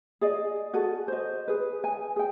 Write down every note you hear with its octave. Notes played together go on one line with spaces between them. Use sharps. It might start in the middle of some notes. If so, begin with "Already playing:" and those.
G#4 D5 D#5
F#4 G#4 A4
C5 D#5
G#4 B4
G#5
G#4 G5